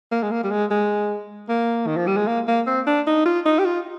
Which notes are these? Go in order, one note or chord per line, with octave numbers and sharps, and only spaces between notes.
A#3
G#3
A#3
G3
G#3
G#3
A#3
D#3
F3
G3
G#3
A#3
A#3
C4
D4
D#4
F4
D#4
G4
F4